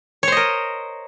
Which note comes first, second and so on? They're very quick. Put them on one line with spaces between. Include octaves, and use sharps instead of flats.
C#5 C5 D#5 A#4